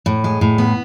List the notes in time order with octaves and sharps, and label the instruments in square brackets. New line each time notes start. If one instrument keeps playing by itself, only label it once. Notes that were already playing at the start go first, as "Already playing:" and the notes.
[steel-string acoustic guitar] A2
G#3
A2
B3